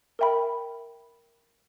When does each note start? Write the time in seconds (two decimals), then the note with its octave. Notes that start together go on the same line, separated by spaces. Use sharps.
0.19 A#4 E5 G5 B5